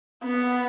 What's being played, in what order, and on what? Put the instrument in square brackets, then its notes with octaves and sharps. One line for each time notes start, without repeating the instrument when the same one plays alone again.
[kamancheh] B3